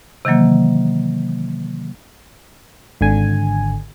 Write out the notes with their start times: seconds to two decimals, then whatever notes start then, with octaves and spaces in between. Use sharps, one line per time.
0.25 C3 D#3 E3 F#3 A#3
3.01 G#1 D3 G#5